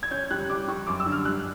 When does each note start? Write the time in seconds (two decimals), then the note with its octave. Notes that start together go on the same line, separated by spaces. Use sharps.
0.03 G#6
0.11 C#4 G6
0.31 G3 F#6
0.50 G3 D6
0.68 G3 C#6
0.87 F#2 D6
1.00 E6
1.06 D3
1.12 F6
1.25 G2 F#6